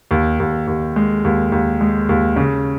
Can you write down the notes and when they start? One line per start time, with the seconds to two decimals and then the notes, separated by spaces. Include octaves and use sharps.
0.11 D#2
0.40 D#2
0.67 D#2
0.96 G#3
1.24 D#2
1.52 D#2
1.81 G#3
2.09 D#2
2.36 C#3